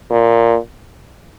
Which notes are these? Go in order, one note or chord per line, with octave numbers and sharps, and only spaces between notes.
A#2